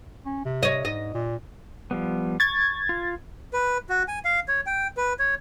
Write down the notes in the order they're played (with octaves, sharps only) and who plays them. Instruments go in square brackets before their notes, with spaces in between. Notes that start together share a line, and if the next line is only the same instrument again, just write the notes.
[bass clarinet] C#4
C3
[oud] C#5 D#5
[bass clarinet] G#2 [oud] D#5
[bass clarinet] A#2
[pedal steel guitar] F3 G3 B3
[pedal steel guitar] C#6 [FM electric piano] G#6 A6
[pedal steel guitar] F4
[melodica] B4
F#4
G#5
F5
C#5
G5
B4
C#5